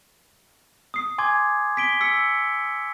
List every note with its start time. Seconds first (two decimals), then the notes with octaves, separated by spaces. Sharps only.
0.94 D#6 C7
1.18 G#5 C6 D6 G#6
1.77 B6 D7 G7
2.01 E6 B6 C#7